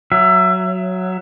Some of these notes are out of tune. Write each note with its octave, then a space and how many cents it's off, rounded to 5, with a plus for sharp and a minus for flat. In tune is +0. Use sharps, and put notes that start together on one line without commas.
F#3 +0 E5 +25